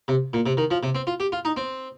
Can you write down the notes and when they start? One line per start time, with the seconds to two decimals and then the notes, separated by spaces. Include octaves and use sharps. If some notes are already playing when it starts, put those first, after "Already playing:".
0.08 C3
0.33 A#2
0.46 C3
0.57 D#3
0.71 F3
0.83 C3
0.95 C4
1.07 F4
1.20 G4
1.32 F4
1.45 D#4
1.57 C4